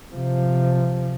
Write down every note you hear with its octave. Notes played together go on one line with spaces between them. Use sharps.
C3 F3